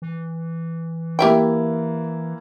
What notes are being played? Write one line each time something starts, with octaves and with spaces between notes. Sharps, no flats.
E3
A#3 E4 G4 E5 G5